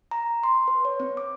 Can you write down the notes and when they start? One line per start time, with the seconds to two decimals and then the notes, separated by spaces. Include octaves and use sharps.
0.11 A#5
0.43 C6
0.68 B4
0.85 C#5
1.00 C4
1.17 D6